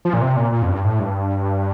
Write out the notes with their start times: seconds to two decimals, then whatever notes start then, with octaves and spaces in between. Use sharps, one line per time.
0.05 F3
0.13 A#2
0.21 C3
0.37 A#2
0.52 A#2
0.63 F2
0.68 G2
0.84 A2
0.99 G2